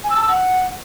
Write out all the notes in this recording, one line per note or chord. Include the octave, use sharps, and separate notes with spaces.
G#5
E6
A5
E6
F#5